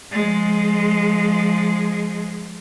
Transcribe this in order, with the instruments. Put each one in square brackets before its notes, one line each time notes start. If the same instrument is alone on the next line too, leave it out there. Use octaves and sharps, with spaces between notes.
[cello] F3 G#3